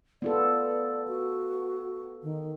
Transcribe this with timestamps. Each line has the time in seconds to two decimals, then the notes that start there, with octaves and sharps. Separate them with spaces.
0.22 B3 F4 A4 D5
1.08 F#4
2.23 D#3